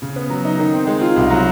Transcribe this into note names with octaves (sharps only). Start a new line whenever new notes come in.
C#3
B3
F#3
D#4
D#3
C4
G#3
F4
C2
F#3